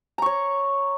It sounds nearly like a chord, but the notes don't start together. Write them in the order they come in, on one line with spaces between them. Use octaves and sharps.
A#5 C#6 C#5